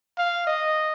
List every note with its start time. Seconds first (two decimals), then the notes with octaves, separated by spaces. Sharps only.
0.18 F5
0.47 D#5